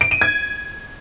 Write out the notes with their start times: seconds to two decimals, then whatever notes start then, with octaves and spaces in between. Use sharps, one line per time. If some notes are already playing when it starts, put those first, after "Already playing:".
0.01 D7
0.11 D#7
0.21 G#6